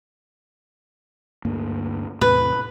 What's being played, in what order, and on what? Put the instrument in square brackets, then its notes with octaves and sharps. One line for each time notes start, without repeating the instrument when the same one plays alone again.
[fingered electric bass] D2 G2 A#3
[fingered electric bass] E2 A2 C3 [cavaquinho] B4